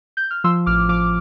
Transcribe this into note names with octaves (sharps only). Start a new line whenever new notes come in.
G6
F6
F3 C6 E6
A1 D6 F6
F3 D6 F6